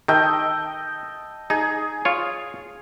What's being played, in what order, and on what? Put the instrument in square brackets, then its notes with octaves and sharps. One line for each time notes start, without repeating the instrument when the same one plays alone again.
[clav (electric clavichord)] D#3 [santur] A4 D#5 G5
[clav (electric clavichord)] D#4 [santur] G#4
[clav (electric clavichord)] F4 C#5